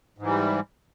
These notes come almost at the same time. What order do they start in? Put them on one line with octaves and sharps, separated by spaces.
G#2 E3 G3